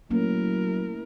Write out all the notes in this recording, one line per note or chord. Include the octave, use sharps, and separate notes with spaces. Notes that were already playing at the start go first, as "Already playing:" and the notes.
F#3 A3 A#3 C#4 E4 A#4